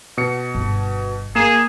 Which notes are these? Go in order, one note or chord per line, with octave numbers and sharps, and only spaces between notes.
B2 C#7
G1
A#3 G#4 A#5 E7